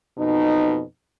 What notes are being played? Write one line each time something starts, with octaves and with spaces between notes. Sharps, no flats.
F2 B2 D#4